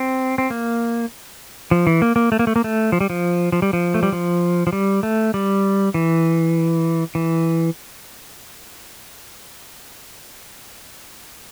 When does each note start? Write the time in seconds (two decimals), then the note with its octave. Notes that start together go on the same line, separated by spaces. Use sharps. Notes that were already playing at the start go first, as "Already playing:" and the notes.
Already playing: C4
0.38 C4
0.50 A#3
1.71 F3
1.87 E3
2.02 A#3
2.16 A#3
2.32 A3
2.39 A#3
2.47 A3
2.56 A#3
2.64 A3
2.92 F3
3.01 G3
3.10 F3
3.52 F3
3.62 G3
3.73 F3
3.94 A3
4.03 G3
4.13 F3
4.67 F3
4.73 G3
5.03 A3
5.34 G3
5.94 E3
7.15 E3